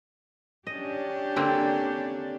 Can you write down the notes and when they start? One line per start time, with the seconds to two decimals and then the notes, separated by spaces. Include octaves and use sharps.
0.67 C#4 D4 G4 D#5
1.36 D3 A#3 C4